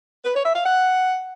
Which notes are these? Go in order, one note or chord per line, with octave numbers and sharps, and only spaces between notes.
B4
C#5
E5
F5
F#5